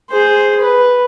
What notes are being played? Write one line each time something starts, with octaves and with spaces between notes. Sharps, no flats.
G#4 C5
B4